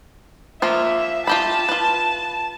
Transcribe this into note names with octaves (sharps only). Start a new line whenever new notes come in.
F3 A#3 F4 E5
F4 G4 A5 B5
F4 B4